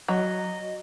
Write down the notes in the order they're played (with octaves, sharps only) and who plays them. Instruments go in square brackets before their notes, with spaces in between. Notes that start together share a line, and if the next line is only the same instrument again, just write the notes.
[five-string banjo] F#3 [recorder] D#5